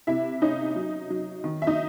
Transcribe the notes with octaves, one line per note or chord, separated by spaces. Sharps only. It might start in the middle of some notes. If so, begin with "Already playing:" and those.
C3 E4 E5
C#4 D#4 D#5
F#3
F#3
D#3
E5
D#4 D#5